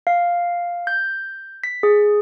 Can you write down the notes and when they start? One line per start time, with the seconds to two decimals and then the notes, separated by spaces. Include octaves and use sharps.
0.07 F5
0.87 G6
1.64 B6
1.83 G#4